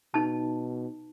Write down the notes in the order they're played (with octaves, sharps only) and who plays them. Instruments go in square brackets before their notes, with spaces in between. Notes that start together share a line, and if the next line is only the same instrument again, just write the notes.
[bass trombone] B2 [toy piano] D#4 A5